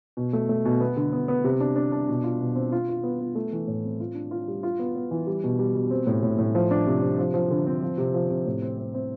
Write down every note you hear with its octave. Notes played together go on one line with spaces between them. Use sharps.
B2
A3
A3
B2
B3
D3
B3
B3
C3
D4
D4
D4
B2
F4
B2
C4
F4
F4
B3
B3
A3
E3
A2
C4
F4
D4
F4
G3
F4
B3
B3
E3
G3
B2
G3
B2
C4
A2
A2
A2
F3
D4
C3
C3
F3
F3
D3
C4
F3
C3
F3
C3
A2
C4
C4
C4